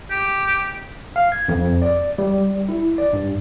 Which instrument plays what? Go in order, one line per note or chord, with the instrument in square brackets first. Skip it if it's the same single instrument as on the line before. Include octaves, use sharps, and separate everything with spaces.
[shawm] G4
[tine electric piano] F5
G#6
F2
D5
G3
E4
D5
G2